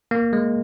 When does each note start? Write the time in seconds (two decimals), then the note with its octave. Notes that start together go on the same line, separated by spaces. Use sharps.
0.11 A#3
0.33 G#3